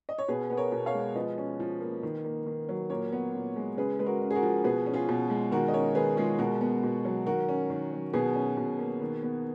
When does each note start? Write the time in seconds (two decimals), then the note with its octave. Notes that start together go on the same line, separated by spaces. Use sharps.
0.09 D#5
0.18 C#5
0.28 B2 G#4 B4
0.50 B3 B4
0.57 A#4 C#5
0.72 B2
0.86 C#5 F5
0.94 G#3
1.15 F3 B4 D#5
1.38 C#4
1.60 F3
1.81 A#3
2.03 D#3
2.25 A#3
2.46 D#3
2.69 F#3
2.90 A#2 A#4 C#5
3.12 B3
3.34 A#2
3.56 G#3
3.77 C#3 G#4 B4
3.99 G#3 B4
4.06 F#4 A#4
4.21 C#3
4.31 G#4
4.35 F#4 A#4
4.43 F3
4.64 B2 G#4 B4
4.86 C#4
4.94 F4 G#4
5.09 B2
5.30 G#3
5.51 D#3 F#4 A#4
5.68 D#5
5.74 C#4 A#4 C#5
5.95 D#3 G#4 B4
6.17 G#3 F4 G#4
6.39 B2 F#4 A#4
6.61 B3
6.83 B2
7.05 F#3
7.26 D#3 F#4 A#4
7.49 C#4
7.70 D#3
7.92 F#3
8.13 B2 G#4 B4
8.35 C#4
8.57 B2
8.79 A#3
9.01 D#3
9.23 B3